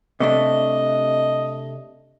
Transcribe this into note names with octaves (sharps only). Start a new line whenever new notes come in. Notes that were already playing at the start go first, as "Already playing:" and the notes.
C3 A3 D4 D#5